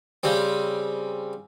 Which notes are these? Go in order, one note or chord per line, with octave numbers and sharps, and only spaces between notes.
C#3 G3 C4